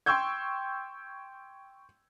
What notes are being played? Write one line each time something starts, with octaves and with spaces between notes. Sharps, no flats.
G5 C6 C#6 E6 G6 G#6